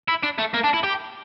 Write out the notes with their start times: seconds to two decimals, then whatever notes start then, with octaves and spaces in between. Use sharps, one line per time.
0.08 E4
0.23 D4
0.39 A3
0.54 A#3
0.64 D4
0.74 E4
0.83 G4